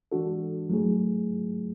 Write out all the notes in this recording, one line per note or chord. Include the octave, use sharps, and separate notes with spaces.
E3 G#3 D4 F#4 A4
F#3 A3 E4 G#4